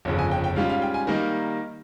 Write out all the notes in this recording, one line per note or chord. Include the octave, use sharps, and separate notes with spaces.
G1 F2 C#3
G#5
G5
G5
G#2 G3 C#4 F4 F5
F5
G5
G#5
D#3 G3 A#3 D#4 A#4